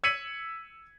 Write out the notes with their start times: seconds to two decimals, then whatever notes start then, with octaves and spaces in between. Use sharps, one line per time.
0.04 E6 G#6 B6 C#7 D#7 F#7